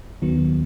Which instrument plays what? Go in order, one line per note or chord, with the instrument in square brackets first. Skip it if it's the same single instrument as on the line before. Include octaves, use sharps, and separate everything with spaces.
[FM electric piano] D#2 D#3 F#3 B3